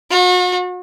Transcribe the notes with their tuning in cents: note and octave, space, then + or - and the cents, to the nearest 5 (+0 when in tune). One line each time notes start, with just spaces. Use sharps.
F#4 -40